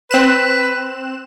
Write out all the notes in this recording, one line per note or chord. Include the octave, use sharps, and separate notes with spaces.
C4 B4 F#6 E7